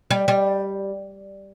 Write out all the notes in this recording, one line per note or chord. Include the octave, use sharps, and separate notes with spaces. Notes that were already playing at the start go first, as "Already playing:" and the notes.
G3
G3